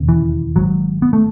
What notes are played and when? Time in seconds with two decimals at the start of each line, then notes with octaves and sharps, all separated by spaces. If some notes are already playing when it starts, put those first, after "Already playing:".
Already playing: E1 D#2 C#3
0.09 E3
0.56 G#1 G#2 F#3
1.02 B3
1.13 A3